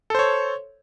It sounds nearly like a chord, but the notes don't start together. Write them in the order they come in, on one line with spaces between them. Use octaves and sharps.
A4 C5 C#5